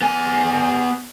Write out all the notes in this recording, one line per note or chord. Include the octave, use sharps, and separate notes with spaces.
B3 G#5